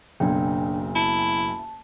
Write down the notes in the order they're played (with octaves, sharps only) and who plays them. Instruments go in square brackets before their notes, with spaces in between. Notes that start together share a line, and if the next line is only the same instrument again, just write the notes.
[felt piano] F#1 B1 [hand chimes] D4 G5
[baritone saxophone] E4 [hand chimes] A5